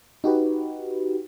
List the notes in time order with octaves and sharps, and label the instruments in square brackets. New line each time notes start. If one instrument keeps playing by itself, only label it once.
[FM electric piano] D#4 F#4 G4 B4